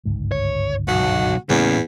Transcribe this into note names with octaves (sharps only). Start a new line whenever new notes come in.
G1 C#2 G#2
C#5
B1 F#4
E2 A2 C#3 G3 A#3 C#4